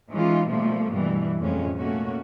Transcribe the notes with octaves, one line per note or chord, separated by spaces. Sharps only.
E3 G#3 C#4 D#4 F4
B2 F3 G3 A3 A#3
G2 B2 E3 G3
F2 A2 G#3 C#4
B2 A3 A#3 C#4 F#4